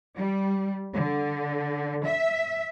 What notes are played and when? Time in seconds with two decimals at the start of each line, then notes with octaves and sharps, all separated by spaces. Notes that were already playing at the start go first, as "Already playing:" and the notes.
0.17 G3
0.93 D3
2.04 E5